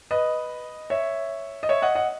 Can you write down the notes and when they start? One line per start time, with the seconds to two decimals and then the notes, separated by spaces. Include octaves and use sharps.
0.11 B4 D#5
0.90 C#5 E5
1.63 D#5
1.69 C#5 E5
1.82 D#5 F#5
1.95 D#5 F#5